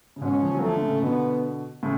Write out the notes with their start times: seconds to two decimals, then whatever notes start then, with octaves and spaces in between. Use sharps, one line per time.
0.16 C#3
0.21 G#2 B2 C#4
0.42 C#3 F3
0.55 F#3
0.61 F3 A3
0.73 D3
0.82 A2 C#3
1.02 B2 D3 B3
1.83 A2 C#3